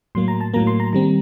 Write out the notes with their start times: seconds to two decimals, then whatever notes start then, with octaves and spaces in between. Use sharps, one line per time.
0.15 A2 F#3 A#3 C6
0.28 A#5
0.41 A5
0.54 A2 F#3 A#3 A#5
0.67 C6
0.80 A#5
0.93 D#3 G3 C4 A#5